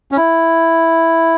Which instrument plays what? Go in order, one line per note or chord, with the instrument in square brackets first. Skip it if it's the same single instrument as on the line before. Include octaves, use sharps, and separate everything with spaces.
[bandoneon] C#4
E4